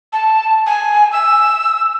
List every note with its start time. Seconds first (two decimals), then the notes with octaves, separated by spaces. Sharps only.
0.13 A5
0.67 G#5
1.13 E6